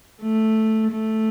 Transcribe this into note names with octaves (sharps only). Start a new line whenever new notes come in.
A3
A3